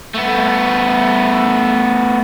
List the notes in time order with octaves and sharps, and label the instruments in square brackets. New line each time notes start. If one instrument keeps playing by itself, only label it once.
[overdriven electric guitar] A3 B3